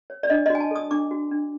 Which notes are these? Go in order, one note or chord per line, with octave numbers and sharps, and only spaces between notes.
C#5
D5
D4 D#5
F#4 D#5
G#5
A5
A4 D#6
D4 D6
F#4
D4